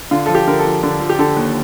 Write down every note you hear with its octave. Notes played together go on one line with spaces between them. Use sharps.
D3 F4
F3 A4
G4
D3 A#4
A4
F3
D3
F3
G4
D3 A4
D#2